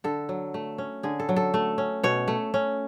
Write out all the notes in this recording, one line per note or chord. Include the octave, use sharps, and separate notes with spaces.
D3 A4
F#3
A3
C#4
D3 G#4
A4
F#3
A4
A3
C#4
B2 C#5
A3
C#4